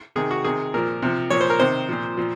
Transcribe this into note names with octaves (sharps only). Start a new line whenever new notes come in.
C3 D#3 G#4
F#4
C3 D#3 G#4
A#2 F3 A#4
C3 F3
A#2 F3 C#5
C5
A#4
C3 D#3 C5
A#2 F3
A#2 F3